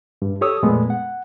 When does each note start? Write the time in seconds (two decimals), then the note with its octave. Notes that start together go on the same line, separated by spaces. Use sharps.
0.22 G2
0.41 G4 A4 C#5 D#6 E6
0.63 F2 A#2 G#3 A3 B3
0.90 F#5